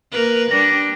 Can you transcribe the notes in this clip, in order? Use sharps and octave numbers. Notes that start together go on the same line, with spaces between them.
A#3 A#4 B4
G3 D4 A#6